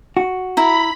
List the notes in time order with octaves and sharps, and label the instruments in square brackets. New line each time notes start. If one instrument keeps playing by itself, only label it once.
[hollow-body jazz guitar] F#4
[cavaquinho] E4 A#5 [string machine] B5